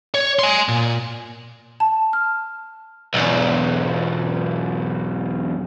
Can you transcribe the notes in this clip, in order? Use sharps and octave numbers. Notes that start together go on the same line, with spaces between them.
C#5
G#5 C6
A#2
A5
F6
B1 E2